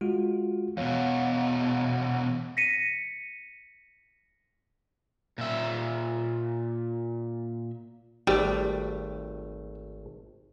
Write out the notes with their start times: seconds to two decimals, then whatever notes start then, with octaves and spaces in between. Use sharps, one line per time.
0.01 G#3 F4 F#4
0.77 E2 B2 C#5 F5
2.57 A#6 B6 C#7 D#7
5.38 A#2 E5
8.27 G#1 G3 A3